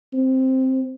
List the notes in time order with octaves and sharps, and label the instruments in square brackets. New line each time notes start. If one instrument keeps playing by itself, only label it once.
[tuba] C4